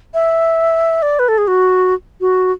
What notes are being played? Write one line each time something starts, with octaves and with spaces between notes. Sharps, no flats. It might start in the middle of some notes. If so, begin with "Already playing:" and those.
E5
D5
B4
A4
G#4
F#4
F#4